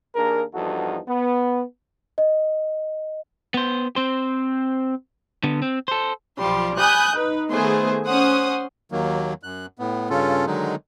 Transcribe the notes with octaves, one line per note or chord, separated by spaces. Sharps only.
D#2 A#3 D4 G#4 A#4
E2 G2 F3 D#4 F#4 A4
B3
D#5
B3 C5
C4 C5
D3 B3
C4
A4 C5
B1 F3 G3 C6
G#5 B5 D#6 F#6 G6
D#4 B4
D#3 A3 B3 G#4 C5
C#4 C5 F#5 D#6
D#2 D#3 F#3 A#3
F#2 F#6
A2 B3
G2 C#3 C#4 F4 A4
D3 D#3 F#3 G#3 D#4